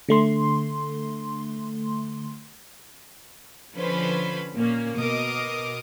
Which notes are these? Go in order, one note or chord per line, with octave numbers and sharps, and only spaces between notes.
D3 A3 C6
D3 F3 C#4 B4 C5 B5
A#2 A#3 C#4
B2 A#4 D#5 D6 D#6